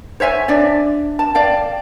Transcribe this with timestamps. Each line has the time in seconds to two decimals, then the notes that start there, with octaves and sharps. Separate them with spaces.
0.20 C5 C#5 E5 G#5
0.48 D4 D5 E5
1.19 A5
1.35 D5 F5 G5